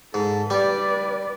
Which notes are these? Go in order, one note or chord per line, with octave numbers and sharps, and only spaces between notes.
G#2 A4
G3 B4 D5